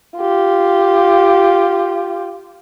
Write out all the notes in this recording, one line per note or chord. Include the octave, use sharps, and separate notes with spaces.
F4 G4